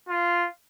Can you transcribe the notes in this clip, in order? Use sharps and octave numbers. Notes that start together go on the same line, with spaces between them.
F4